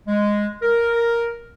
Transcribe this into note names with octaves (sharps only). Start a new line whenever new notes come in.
G#3
A#4